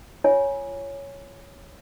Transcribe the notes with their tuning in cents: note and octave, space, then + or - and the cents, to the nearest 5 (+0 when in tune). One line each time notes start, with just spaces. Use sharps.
F4 -25 C#5 +0 G#5 +0